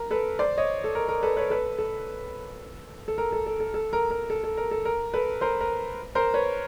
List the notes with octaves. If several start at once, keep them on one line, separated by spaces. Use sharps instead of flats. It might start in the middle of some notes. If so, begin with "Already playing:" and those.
Already playing: A#4
A4 B4
C5 D5
C#5 D#5
A4
A#4
A#4
A4 B4
B4 C#5
A4 B4
A4
A4
A#4
A4
A4
A4
A4
A#4
A#4
A4
A4
A#4
A4
A#4
A4 B4
A#4 C5
A#4
A#4 C5
B4 C#5